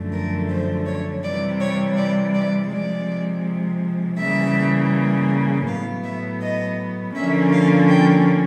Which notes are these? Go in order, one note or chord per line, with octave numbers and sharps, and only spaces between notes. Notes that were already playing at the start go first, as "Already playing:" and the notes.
Already playing: F#2 D3 F3 A3
A#4
C5
C#5
C3 E3 G3 D5
C#5
D5
D5
C3 F3 G#3 D5
C#3 E3 G3 A#3 E5
A2 F#3 B3 F5
E5
D#5
D3 F3 A#3 C#4 E5
F5
G5